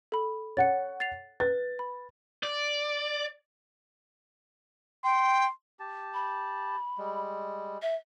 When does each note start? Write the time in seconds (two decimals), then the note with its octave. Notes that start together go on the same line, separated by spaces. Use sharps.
0.12 A4 B5
0.57 C#5 F#5 A6 C#7
1.00 A6 C7 F7
1.40 B4 A6
1.79 B5
2.43 D5
5.04 G5 C6
5.80 G4 A5
6.14 B5
6.98 G3 G#3
7.82 E5